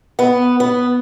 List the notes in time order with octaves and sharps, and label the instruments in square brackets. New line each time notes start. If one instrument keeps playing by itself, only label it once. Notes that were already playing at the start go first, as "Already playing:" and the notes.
[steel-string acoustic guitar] B3
B3